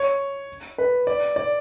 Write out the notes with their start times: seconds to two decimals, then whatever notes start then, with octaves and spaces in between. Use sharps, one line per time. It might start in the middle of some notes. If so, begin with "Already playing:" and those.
Already playing: C#5
0.78 B4
1.07 D5
1.36 D5